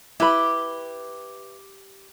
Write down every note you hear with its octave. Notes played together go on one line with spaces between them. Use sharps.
E4 G4 B4 B5